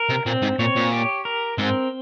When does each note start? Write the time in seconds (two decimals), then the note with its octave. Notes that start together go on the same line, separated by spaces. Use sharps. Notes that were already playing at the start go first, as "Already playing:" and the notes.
Already playing: A#4
0.09 C3
0.26 A#2 C4
0.42 G#2
0.59 A#2 C#5
0.76 A#2
0.92 G4
1.25 A#4
1.58 G#2 C4